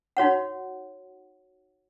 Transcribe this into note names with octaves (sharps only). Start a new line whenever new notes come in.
D#4 F#4 C#5 F#5